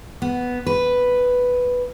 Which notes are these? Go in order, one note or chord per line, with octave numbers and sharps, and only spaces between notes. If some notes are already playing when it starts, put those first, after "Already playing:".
B3
B4